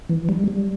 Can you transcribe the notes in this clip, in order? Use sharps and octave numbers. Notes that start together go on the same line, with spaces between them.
E3
G3
G3